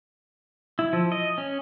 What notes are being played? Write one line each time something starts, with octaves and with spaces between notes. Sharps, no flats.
E4
F3
D#5
C#4